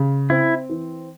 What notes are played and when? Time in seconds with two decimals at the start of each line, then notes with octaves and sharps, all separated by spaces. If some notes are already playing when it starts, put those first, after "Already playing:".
Already playing: C#3
0.30 C4 E4
0.69 E3